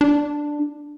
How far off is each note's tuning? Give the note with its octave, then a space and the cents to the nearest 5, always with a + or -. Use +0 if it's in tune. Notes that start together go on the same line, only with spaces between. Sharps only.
D4 +5